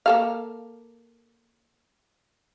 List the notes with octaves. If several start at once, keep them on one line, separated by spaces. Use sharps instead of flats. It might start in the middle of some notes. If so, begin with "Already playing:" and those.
A#3 A4 F5